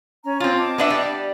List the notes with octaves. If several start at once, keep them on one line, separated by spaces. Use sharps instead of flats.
C#4 A#5
C4 F4 C6
D#5 A5 D6
B3 D4 E5
G3